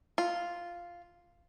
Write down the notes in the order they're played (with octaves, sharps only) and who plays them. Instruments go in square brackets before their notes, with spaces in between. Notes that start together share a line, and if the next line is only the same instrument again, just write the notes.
[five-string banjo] F4